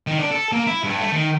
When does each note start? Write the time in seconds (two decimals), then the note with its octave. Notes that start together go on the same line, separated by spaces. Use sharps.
0.07 D#3
0.19 D4
0.31 A4
0.52 A#3
0.67 E4
0.84 G2
1.01 A3
1.13 D#3